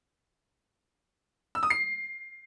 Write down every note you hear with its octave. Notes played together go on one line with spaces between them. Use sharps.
E6
D#6
C7